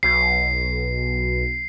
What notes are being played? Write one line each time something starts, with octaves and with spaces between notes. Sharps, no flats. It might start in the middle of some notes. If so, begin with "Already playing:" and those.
B1 B2 C7